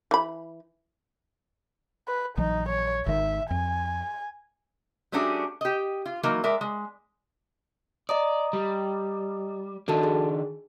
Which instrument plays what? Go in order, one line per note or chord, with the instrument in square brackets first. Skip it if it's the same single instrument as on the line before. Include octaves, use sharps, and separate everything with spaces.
[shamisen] E3 B5
[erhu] B4
[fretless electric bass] A#1 E3 F#3 [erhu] D#4
[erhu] C#5
[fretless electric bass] G#1 D#3 [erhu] E5
[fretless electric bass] F2 [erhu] G#5
[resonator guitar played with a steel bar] G3 A3 C#4 D4 F#4 G#4
G4 D#5
F4
E3 F#3 A#3 D#4
G#3 A#4 D5 E5
G#3
[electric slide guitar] D5 [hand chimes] D#5 A#5 D#6
[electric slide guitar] G3
[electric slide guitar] D#3 D4 [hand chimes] F#4 A4 A5
[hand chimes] G#4